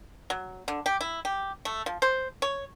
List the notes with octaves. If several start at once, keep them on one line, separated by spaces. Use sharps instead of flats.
F#3
D3
G4
E4
G4
A3
F3
C5
C#5